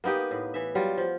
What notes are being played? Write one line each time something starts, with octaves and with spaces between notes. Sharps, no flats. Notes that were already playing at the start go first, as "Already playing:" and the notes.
A#3 B3 D#4 G4
A2
E3 E5
F#3 G3 F4
F3